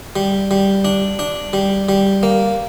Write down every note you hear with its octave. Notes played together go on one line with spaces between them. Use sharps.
G3
G3
D4
D4
G3
G3
A#3